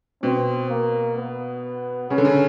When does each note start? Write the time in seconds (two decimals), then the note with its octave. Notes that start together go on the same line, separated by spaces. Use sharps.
0.23 B2 C4
0.69 A#3
1.17 B3
2.10 C#3 C#4
2.18 D3
2.25 C#3